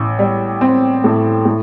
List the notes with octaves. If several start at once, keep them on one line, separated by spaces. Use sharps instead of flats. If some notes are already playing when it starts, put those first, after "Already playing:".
Already playing: A1
G3
C4
A2
A2